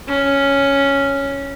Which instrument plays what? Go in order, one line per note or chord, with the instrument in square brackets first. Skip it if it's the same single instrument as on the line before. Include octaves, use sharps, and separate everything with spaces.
[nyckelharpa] C#4